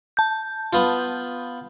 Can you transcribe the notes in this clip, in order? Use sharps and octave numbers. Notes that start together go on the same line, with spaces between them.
A5 G6
B3 F4